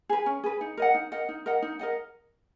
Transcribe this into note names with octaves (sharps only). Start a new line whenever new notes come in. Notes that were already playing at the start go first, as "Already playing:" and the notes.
G#4 B4
C#4
G#4 B4
D#4
A#4 D#5 F#5
D#4
A#4 D#5 F#5
D#4
A#4 D#5 F#5
D#4
A#4 D#5 F#5